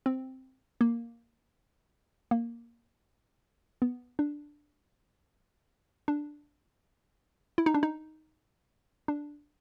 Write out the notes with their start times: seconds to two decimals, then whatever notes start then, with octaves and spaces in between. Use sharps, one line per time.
0.06 C4
0.81 A#3
2.31 A#3
3.82 B3
4.19 D4
6.08 D4
7.58 E4
7.66 D#4
7.74 D4
7.83 D#4
9.08 D4